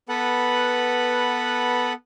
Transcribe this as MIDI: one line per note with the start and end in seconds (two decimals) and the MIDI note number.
0.09 1.93 59
0.09 1.93 69
0.09 1.93 71
0.09 1.93 78